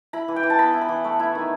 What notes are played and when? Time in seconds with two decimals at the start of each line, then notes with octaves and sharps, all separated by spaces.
0.13 E4 B5
0.28 E3
0.36 G5
0.43 E3
0.50 A5
0.59 B3 B5
0.74 E4
0.81 B5
0.89 E3
1.04 A3
1.19 E4
1.35 D#3